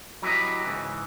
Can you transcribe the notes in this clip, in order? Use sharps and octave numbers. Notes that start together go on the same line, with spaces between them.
F#3 E4 G4 B4 D#5
G#2 C#3 E3